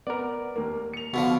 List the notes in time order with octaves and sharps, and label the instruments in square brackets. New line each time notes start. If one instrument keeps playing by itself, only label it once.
[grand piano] B3 [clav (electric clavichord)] A#4 D5
[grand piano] D#2 A#3
C#7 F7
[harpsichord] B2 D3 F3